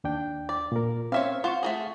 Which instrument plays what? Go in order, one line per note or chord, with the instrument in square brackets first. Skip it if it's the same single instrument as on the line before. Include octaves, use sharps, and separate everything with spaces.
[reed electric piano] D#2 D4 G5
[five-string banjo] D5
[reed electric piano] A#2 A#4
[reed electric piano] C4 C#4 [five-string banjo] C#5 E5 F5
[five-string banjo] F4 C5 [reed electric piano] F#5 C#6
[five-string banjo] A3 F#4 G#4